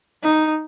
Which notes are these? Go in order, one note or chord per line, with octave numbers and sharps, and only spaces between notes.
D#4